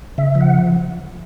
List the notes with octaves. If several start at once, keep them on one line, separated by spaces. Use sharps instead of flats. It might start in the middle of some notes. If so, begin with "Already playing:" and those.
C#3 E5
F3
F#5